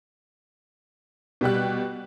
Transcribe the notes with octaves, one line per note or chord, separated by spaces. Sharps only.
B2 G3 G4 F#6